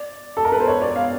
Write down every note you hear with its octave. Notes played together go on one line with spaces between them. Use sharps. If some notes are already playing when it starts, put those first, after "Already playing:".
Already playing: D5
A4
A#4
B4
C5
C#5
D5
F5